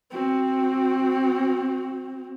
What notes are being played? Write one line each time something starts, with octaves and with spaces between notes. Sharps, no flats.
C4 F#4